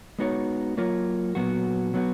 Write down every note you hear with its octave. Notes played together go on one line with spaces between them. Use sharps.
G#3 B3 D#4 F#4 C#5
F#3 A#3 F4 A#4 C#5
A#2 F#3 B3 F#4
F#3 B3 F#4